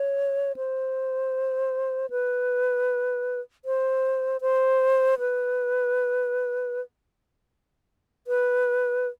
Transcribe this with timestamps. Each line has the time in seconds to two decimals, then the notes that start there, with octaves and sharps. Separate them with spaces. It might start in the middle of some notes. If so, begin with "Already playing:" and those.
Already playing: C#5
0.56 C5
2.10 B4
3.65 C5
4.41 C5
5.19 B4
8.27 B4